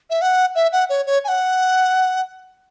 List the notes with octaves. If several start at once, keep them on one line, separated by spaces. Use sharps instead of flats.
E5
F#5
E5
F#5
C#5
C#5
G#5
F#5